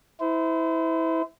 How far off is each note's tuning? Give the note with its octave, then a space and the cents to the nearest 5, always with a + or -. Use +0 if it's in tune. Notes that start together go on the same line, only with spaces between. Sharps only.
E4 -20 C5 -35